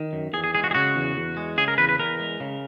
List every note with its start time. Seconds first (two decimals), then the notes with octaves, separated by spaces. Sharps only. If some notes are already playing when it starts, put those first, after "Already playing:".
Already playing: D#3
0.13 F#2
0.33 E2 G#4
0.44 G#4
0.55 G#3 G#4
0.64 F#4
0.71 G#4
0.74 C#3 F#4
0.96 E2
1.17 E2
1.37 G#3
1.57 C#3 G#4
1.68 A#4
1.78 E2 B4
1.89 B4
1.99 E2 A#4
2.20 G#3
2.40 C#3